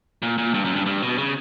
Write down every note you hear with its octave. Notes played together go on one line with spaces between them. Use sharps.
A#2
A#2
G2
F#2
G2
G2
B2
C#3